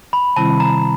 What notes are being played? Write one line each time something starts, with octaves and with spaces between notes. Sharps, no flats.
B5
C3 D#3 G3 C4 E4 A5
A#5